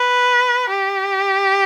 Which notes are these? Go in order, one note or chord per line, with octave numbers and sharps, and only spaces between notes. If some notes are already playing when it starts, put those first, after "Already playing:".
Already playing: B4
G4